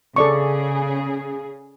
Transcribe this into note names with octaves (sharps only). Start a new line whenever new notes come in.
C#3 G#4 A4 D5 C#6